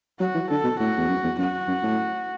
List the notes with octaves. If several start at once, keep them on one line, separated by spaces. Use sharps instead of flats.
F#3 F#4
E3
D3 A4
B2
A2 F#4
E2
F#2
E2
F#2 F#4
F#2
A2